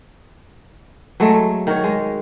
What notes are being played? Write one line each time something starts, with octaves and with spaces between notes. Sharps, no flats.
F#3 G#3 A3
D#3 F#4 C#5
G#3